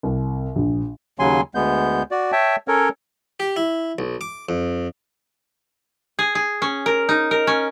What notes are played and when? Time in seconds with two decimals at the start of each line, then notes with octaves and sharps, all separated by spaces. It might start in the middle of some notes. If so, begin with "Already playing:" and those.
0.03 C2
0.56 A#1
1.19 D#2 C#3 F#3 G#5 C6
1.55 D2 G#3 B3 G6
2.11 F#4 D5
2.32 C#5 E5 G5 A5
2.68 C#4 A4 A#4 C#5
3.40 G4
3.56 E4
3.99 B1
4.21 D6
4.49 F2
6.19 G#4
6.35 G#4
6.62 C#4
6.86 A#4
7.09 D#4
7.31 A#4
7.47 C#4